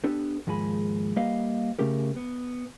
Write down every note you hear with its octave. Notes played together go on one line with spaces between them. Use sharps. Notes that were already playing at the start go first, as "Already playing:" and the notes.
B3 D4 G4 A4
D#2 G#2 F3 G#3 G#5 B5
G3 A#3 G4 B4 D#5 F5
C#3 A3 C#4 G4 A#4
B3